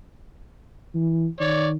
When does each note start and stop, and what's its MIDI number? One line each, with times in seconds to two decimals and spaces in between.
0.95 1.28 52
1.40 1.76 51
1.40 1.68 73
1.40 1.68 74